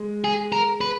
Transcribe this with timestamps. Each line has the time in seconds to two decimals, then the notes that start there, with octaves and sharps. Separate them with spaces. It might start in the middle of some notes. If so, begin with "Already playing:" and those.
Already playing: G#3
0.24 G#4
0.52 A#4
0.81 B4